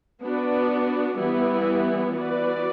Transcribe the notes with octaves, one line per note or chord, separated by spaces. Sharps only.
B3 D4 F#4
E3 G3 B3 E4
E3 B3 F#4 B4 D5